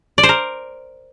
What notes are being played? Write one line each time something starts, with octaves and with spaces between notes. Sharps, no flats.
D5
C5
A#4